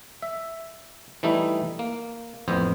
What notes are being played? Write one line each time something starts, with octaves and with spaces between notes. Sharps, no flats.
E5
E3 G3 A3 D#4 E4
A#3
A1 F2 B3 C5